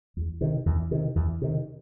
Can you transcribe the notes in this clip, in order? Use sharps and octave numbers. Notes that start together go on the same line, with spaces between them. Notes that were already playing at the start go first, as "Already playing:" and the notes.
E2
C3 D#3
E2
C3 D#3
E2
C3 D#3